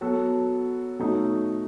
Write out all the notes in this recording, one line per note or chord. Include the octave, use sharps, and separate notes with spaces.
F#3 B3 F#4 A4
B2 F#3 A3 D#4